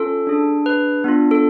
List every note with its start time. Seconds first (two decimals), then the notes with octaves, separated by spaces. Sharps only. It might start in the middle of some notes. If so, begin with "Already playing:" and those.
Already playing: C#4 F4 A4
0.27 D4 G#4
0.66 B4
1.04 B3 D4 F4
1.31 A4